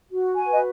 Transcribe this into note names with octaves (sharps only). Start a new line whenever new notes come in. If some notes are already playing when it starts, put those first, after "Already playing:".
F#4
G#5
B4
D#5